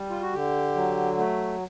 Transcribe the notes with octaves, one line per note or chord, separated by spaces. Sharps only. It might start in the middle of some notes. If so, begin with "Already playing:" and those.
Already playing: G3
F4
F#4
D3 G4
F#3
A3